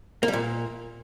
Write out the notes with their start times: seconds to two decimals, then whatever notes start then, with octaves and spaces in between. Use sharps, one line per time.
0.23 A#3
0.28 G3
0.33 A#2